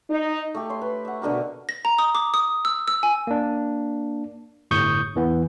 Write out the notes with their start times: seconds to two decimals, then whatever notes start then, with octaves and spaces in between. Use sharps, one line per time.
0.10 D#4
0.55 A3 G4
0.70 C#5 C6
0.82 B4
1.05 E5 F#5
1.22 B2 D3 G4 A#4
1.69 A#6
1.85 A#5
1.99 D#6
2.15 D6
2.34 D#6
2.65 E6
2.88 E6
3.03 G#5
3.27 A#3 D4
4.71 G1 A2 C#6 D#6 G6
5.15 E2 E3 B3